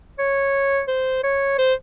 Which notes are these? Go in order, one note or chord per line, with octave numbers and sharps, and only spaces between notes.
C#5
C5
C#5
C5